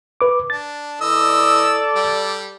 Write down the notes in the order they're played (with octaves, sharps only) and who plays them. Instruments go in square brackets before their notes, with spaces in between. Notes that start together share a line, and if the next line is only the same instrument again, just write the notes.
[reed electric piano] B4 D6
[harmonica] D4 [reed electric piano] A6
[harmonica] E3 D#5 E6 [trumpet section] A4 D5
[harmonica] G3